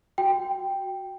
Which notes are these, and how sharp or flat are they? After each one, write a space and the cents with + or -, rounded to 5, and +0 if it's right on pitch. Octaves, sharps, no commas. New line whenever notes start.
F#4 +0 G5 +0